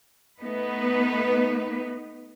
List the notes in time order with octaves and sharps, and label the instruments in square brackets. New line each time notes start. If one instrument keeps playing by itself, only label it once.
[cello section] A3 B3 D#4 B4